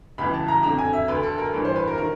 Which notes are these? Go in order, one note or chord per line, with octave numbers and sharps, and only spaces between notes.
C#2 C#3 E3 B5
A5
A#5
F2 D3 A#5
G#5
E5
D2 D3 B4
A4
A#4
G2 E3 B4
C5
B4
A#4
D#3 A#4